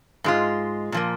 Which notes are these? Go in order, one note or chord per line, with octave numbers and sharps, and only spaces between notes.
G#2 G#3 F4
A#2 F3 A#3